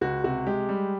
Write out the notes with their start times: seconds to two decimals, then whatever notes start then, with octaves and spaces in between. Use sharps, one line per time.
0.01 C#2 F#4
0.24 C3 F#4
0.46 G#3 G4
0.69 G3